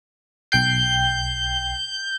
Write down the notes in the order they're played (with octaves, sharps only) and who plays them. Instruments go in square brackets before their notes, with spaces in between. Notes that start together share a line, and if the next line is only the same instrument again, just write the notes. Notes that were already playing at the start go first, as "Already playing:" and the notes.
[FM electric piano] B1 G5 C7 [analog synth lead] G6